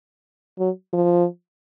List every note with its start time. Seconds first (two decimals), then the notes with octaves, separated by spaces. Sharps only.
0.59 F#3
0.93 F3